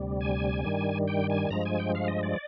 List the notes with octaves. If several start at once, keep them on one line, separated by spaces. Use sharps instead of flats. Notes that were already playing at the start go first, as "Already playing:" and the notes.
Already playing: D2 C3 G3
G#5
G2 D#3 G3
G5
G#5
G2 F3 G#3 A#5
G#5
G5
F5
D#5
D5